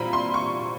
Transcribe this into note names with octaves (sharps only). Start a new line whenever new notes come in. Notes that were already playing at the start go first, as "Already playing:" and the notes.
Already playing: A#2 G3 C4 A#5 B5
C6
C#6